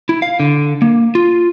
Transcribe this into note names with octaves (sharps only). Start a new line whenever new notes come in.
E4
F5
D3
A#3
F4